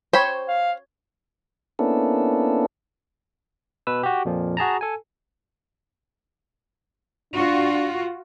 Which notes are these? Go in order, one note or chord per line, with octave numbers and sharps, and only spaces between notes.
C5 C#5 G5 B5
F5
A#3 B3 C#4 D4 E4 A4
B2 B4 E6
F#4 G4
F2 A#2 F3
F#4 G#4 A5 A#5
A4 G#5
D4 F4 F#4